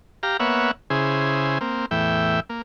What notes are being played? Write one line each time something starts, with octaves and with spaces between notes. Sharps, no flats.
G4 F5 A#5
A#3 B3 C#5 E5 F#5
C#3 E4 G#4 C5
A#3 C4
E2 A2 E5 G5
A#3